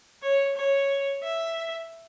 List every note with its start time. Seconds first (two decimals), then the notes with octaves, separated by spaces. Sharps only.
0.22 C#5
0.56 C#5
1.23 E5